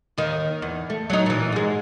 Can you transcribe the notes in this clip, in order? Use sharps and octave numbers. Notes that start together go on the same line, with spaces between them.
D#2 D#3
E2
A3
F#3 D#4
A#2 E3
G#2 G#3